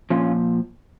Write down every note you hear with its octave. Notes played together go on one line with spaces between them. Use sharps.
A#2 F3 C#4 F4